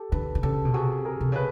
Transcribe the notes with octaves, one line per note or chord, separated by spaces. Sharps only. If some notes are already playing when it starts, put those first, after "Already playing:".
Already playing: G4 A4
D3 A4 B4
D3
C#3 G4 A4
B2
C3 F#4 G#4
G#4 A#4
C3
C#3 B4